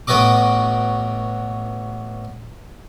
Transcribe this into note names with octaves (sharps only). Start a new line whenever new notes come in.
A1 B3 F#4 D#5 D6